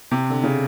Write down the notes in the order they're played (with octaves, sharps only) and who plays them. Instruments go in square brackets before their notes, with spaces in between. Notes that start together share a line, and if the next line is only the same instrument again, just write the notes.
[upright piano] C3
D3
C#3